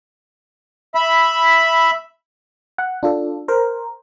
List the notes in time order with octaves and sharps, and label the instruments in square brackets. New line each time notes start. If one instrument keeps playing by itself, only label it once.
[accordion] E5 B5
[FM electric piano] F#5
D4 F4 A4
A#4 C5